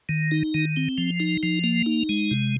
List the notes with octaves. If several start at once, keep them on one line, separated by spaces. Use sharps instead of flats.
D#3
D#4
D#3
C4
F3
D#4
F3
A#3
D#4
G#3
C3